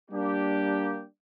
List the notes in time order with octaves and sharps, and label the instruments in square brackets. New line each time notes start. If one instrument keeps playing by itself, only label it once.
[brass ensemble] G3 A#3 D4 G4